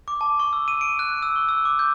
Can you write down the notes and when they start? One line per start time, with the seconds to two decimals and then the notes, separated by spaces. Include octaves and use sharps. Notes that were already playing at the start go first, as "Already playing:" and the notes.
0.08 D6
0.21 A5
0.40 C#6
0.53 E6
0.68 D#7
0.81 D7
0.99 F#6
1.23 E6
1.36 C#6
1.49 E6
1.65 D6
1.79 G6